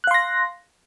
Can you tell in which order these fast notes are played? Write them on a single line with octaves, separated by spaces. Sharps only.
F#6 F5 C6 A#6